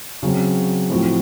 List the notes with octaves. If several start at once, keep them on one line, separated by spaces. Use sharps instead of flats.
C#3 F#3 C4
A2 F3 C4 F#4